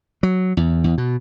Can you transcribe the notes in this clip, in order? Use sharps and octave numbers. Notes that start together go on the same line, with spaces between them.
F#3
E2
E2
B2